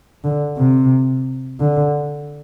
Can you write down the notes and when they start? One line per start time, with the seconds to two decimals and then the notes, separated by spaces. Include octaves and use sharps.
0.24 D3
0.57 C3
1.60 D3